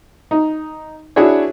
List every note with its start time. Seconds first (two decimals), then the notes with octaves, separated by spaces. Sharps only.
0.31 D#4
1.16 D4 E4 F#4 G#4 C#5